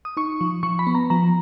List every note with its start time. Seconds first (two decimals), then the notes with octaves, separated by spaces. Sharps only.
0.05 D#6
0.17 D#4 C#6
0.41 F3
0.63 F3 C#6
0.79 B5
0.87 B3
0.95 A#5
1.10 F3 A#5